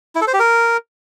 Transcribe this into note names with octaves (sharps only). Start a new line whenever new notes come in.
E4
A4
C5
G4
A#4